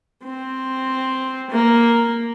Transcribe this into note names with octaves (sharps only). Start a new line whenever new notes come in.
C4
A#3